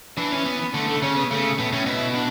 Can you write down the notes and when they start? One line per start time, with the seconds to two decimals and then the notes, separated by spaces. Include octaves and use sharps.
0.17 E3 D4
0.32 C#4
0.46 B3
0.74 D3 A3
0.89 A3
1.02 C#3 C#4
1.16 B3
1.31 C#3 A3
1.59 A2 B3
1.72 A2 C#4
1.86 B2 E4
2.15 D4